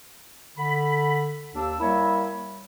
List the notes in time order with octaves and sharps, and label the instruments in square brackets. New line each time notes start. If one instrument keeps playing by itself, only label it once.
[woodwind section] D3 B5
D#2 D4 E6
G3 A#3 E4 A#4 C#5 E5